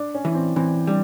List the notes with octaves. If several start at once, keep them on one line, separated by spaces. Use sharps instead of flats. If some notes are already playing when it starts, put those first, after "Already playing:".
Already playing: D4
C#4
E3
C4
E3 C4
G3 D4